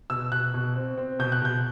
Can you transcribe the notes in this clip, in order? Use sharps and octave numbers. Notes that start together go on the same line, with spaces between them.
B2 E6
B2 F#6
B2
C4
C4
B2 G6
F#6
B2 G6